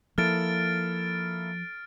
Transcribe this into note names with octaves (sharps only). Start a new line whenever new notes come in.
F3 A#3 E4 A4 F6 A6 D7